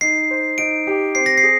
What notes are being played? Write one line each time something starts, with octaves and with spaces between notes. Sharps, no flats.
D#4 C7
C5
D#4 D7
G4
C4 C7
A#6
C7
G#4